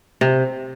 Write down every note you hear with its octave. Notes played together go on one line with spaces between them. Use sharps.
C3